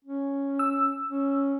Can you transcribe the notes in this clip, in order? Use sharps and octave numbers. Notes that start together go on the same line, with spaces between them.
C#4
E6
C#4